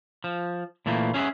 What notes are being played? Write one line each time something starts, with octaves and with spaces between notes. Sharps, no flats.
F3
A#2 E3 A3 A#3
C#4 G#4 C#5 E5 F#5